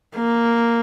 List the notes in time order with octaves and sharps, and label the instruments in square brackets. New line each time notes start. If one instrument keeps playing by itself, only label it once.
[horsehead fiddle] A#3